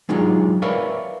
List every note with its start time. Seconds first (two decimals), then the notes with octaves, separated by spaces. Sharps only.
0.09 F#3 G#3 D4 D#4 F4 G#4
0.62 A#4 B4 C#5 D5 E5 F5